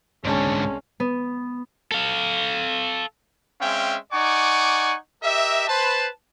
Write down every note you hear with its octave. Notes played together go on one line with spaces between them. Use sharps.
C2 G#2 D3 G#3 C#4 A5
B3
A4 F5
G#3 C4 C#4 E5 F5 G5
D#4 D5 F#5 G#5 C#6 D6
G4 A#4 D#5 E5
B4 C5 A5